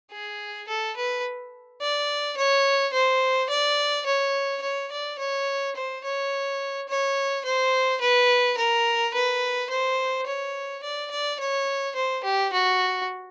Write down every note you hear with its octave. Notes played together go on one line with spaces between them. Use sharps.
G#4
A4
B4
D5
C#5
C5
D5
C#5
C#5
D5
C#5
C5
C#5
C#5
C5
B4
A#4
B4
C5
C#5
D5
D5
C#5
C5
G4
F#4